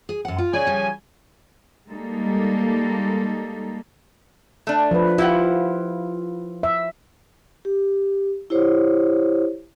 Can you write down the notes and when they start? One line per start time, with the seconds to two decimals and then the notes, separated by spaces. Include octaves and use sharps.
0.09 G#4
0.25 F#2 F#5
0.38 F4
0.53 C#3 D5 G#5
0.67 F3 G3
1.90 G3 G#3 A#3 D#4 A4
4.67 A3 D4
4.91 F3 B4
5.18 E4 F4 G4 F#5
6.63 E5
7.65 G4
8.50 E4 G4 C5 C#5